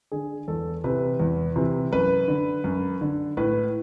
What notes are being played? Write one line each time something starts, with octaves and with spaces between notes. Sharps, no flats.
D3 G#4
E2 A4
C3 E3 B4
E2
C3 E3
F#2 B4
D3
F#2
D3
A2 B4